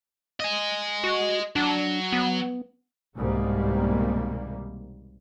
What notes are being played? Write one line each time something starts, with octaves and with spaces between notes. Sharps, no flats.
D#5 G#5
F#4
F#3 D4
B3
C2 G#2 B2 D#3 G3 A#3